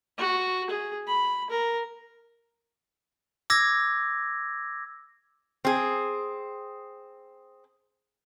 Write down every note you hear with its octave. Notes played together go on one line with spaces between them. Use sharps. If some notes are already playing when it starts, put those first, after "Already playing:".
F#4
G#4
B5
A#4
D6 E6 G#6 A#6
C4 G#4